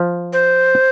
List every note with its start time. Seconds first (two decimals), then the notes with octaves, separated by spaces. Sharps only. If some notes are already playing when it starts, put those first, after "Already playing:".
Already playing: F3
0.33 C5